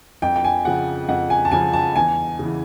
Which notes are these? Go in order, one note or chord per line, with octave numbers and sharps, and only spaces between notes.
F2 G5
G5
G#5
C#3 F3 F#5
F2 F#5
G#5
A5
C#3 F3 G#5
A5
E2 G#5
C#3 E3